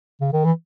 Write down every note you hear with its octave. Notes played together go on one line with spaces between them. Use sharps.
C#3
D#3
E3